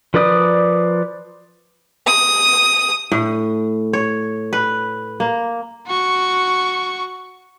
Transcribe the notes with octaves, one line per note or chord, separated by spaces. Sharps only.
F3 A#4 B4 D5 D#6
D#6
A2
C#5
B4
A#3
F#4 C#6